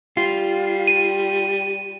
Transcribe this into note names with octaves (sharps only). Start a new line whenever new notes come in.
G3 F4
D#7